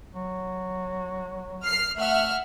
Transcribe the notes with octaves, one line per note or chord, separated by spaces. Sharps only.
F#3
F6 C7
A3 E5 F#5 F6